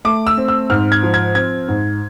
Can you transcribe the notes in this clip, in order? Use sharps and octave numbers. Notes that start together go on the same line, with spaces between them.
A3 D6
E6
C4
E6
G#2 F6
G#6
F3
G#6
C4 G#6
G#2